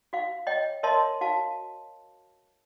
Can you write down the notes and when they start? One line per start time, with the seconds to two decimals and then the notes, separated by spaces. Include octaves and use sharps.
0.13 F#4 F5
0.47 C#5 D#5 G5
0.83 A#4 C#5 D#5 E5 A5 C6
1.21 F#4 F5 A5